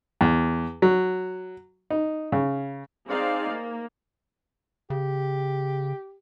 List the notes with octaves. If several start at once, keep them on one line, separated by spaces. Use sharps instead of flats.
E2
F#3
D#4
C#3
C4 D#4 G#4 C5 D5 F5
A#3
C#3 G4